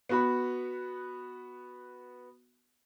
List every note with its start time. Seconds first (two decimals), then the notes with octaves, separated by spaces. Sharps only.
0.09 B3 F#4 B5